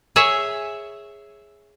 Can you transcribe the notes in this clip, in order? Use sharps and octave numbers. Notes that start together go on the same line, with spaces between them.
G#4 C#5 E5